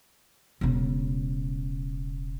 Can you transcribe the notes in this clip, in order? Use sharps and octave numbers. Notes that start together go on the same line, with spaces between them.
E1 C#3